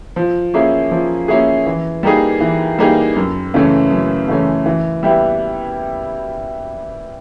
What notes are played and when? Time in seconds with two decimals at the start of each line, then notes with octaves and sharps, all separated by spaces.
0.16 F3
0.54 A#3 C#4 E4 G#4
0.91 F3
1.28 A#3 C#4 E4 G#4
1.66 E3
2.03 G3 A#3 D#4 G#4
2.40 E3
2.78 G3 A#3 D#4 G#4
3.16 F#2
3.54 C#3 E3 A3 C#4
3.91 F#2
4.28 C#3 E3 A3 C#4
4.66 E3
5.03 G3 B3 E4